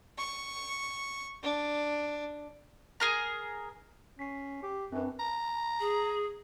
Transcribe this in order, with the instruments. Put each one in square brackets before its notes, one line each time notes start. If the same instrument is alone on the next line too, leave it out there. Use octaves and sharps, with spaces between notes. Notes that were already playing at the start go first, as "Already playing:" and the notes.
[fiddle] C#6
D4
[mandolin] G#4 A#4 A#5
[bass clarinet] C#4 [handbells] B6 C7
[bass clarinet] G4
[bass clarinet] F#2 [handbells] C4 D4 B4
[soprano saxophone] A#5
[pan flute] G#4